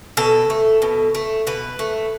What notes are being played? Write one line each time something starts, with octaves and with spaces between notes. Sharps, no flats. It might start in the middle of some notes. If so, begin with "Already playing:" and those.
B2 A4
A3
B2
A3
B2 B4
A3